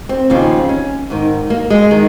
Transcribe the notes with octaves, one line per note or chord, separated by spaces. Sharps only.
C4
D#2 C#3 F3
C#4
G#2 D#3
A#3
G#3
D#3